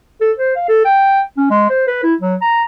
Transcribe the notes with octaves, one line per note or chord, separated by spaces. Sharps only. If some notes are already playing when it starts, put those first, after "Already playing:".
A4
C5
F5
A4
G5
C#4
G#3
C5
B4
E4
F#3
A#5